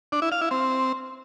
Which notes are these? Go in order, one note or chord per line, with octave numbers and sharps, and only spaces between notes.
D4
E4
F5
E4
C4